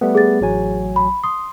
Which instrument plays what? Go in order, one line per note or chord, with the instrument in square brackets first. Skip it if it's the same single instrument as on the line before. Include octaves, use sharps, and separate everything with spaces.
[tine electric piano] G3 A3 B3
[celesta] G#4 A6
[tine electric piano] A1 F#3 G#5
[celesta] B5
[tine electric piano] C6 [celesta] D#6